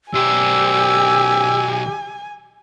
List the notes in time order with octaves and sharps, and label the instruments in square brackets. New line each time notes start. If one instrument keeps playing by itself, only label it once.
[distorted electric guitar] B1 C5 [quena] G4 [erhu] G#5 [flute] E6